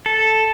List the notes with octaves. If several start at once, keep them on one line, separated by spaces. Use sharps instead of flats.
A4